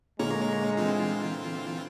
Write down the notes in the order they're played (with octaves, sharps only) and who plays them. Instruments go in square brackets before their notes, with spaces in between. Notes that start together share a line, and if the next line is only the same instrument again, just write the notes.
[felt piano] A#2 D3 [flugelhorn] G#3 [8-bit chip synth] A#3 C#5 A#5
[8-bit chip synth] E3 C4 F4